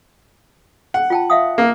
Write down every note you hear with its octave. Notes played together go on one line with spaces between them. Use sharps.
F#5
F4 G5 A5
E5 F5 D#6
A#3